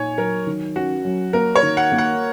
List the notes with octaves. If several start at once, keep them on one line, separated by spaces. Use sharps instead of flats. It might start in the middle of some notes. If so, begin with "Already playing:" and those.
Already playing: A#2 D#4 C#5 G#5
F#3 A#4
D#3
C#4 F#4
F#3
A#3 A#4
C#5
D#3
F#5
A#3
F#5